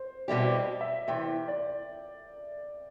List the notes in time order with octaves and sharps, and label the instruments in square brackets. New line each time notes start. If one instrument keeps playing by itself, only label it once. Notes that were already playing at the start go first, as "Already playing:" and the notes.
Already playing: [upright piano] C5
[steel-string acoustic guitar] B2 G3 C4 E4 G4 [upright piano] D5
[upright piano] D5
D#5
E5
[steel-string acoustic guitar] E2 C3 E3 [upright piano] G5
[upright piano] D5